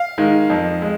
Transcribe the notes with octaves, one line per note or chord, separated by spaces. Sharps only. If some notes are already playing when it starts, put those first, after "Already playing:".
Already playing: F5
D#3 G#3
F2
G#3